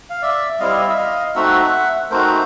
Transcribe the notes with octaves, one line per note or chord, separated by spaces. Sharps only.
F5
D5 E5
G3 C4 E4 D#5 F5
D5
D#5
E5
D#5 F5
A3 C4 D#4 F#4 E5 F#5
A3 C4 D#4 F#4 A#4 C5